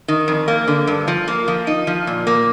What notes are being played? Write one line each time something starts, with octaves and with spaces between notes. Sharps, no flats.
D#3
F2
A#3
D3
G2
F3
A#3
F3
D#4
F3
A#2
A#3